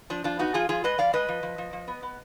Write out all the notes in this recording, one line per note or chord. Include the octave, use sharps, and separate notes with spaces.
F3 D4
F3 D4 F4
B3 D#4 F#4
F3 F4 G#4
F3 F4 G#4
G#3 B4 D#5
F3 D5 F5
G#3 B4 D#5
F3
F3
F3
F3
B3
B3